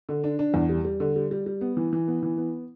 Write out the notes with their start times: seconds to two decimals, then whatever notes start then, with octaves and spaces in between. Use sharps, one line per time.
0.09 D3
0.24 D4
0.39 D4
0.54 E2
0.69 G3
0.85 G3
1.00 D3
1.16 G3
1.31 G3
1.46 G3
1.61 B3
1.77 E3
1.93 E3
2.08 B3
2.23 E3
2.37 B3